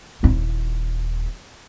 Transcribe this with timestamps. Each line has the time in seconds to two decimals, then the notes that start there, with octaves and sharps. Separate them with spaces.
0.23 D#1 E4